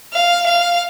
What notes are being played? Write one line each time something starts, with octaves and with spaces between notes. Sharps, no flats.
F5
F5